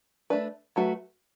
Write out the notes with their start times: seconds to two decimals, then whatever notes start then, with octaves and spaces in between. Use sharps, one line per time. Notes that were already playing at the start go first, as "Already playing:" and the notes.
0.30 A3 D4 B4
0.76 F#3 A3 F#4 B4